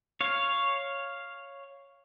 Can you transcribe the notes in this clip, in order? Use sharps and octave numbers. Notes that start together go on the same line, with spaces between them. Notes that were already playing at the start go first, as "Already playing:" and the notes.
C#5 F5